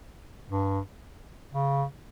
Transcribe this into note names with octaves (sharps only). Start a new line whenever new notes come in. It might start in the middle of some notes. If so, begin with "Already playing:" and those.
G2
C#3